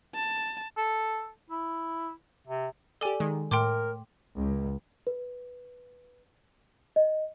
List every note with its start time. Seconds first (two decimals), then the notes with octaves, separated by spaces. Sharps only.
0.15 A5
0.77 A4
1.50 E4
2.47 C3
3.01 G4 A4 D5 G#5
3.20 D#3 G#3
3.51 A2 A#4 G5 C6 D6
4.36 C#2
5.07 B4
6.96 D#5